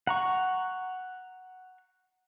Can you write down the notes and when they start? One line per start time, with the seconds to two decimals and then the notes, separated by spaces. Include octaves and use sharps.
0.07 F#5 A#5 C#6